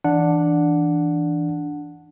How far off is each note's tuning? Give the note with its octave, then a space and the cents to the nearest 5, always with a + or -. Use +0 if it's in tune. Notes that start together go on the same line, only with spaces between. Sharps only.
E3 +0 D4 +0 F#5 -10